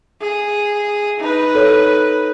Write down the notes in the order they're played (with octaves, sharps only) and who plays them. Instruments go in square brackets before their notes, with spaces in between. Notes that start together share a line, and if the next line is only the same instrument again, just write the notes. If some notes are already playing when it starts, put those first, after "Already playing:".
[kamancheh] G#4
D#4 B4
[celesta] A4 C#5